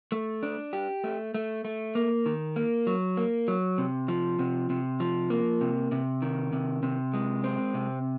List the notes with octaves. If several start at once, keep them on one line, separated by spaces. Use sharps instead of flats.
A3
D4
G4
A3
A3
A3
A#3
D#3
A#3
F#3
A#3
F#3
C3
F3
C3
C3
F3
A#3
C3
C3
D#3
C3
C3
G#3
C4
C3